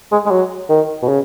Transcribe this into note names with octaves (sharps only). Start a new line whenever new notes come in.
G#3
G#3
F#3
D#3
B2
C#3